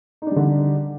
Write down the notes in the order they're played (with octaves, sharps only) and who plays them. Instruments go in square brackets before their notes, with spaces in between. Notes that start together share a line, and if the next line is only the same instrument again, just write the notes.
[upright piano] D#4
D4
G3
D3